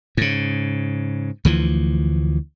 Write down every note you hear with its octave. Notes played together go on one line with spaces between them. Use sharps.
G#2 C#3
D2 E3 F3